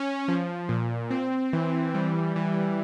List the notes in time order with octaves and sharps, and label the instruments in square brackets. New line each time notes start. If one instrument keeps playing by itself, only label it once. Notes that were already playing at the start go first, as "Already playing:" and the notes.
Already playing: [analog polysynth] C#4
F3
A#2
C4
E3
G3
E3